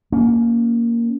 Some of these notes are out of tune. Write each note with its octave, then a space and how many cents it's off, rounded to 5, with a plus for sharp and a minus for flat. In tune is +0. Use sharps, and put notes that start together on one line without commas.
A#3 +0 C#4 +20